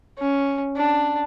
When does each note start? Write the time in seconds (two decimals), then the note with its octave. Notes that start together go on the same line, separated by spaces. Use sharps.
0.19 C#4
0.77 D4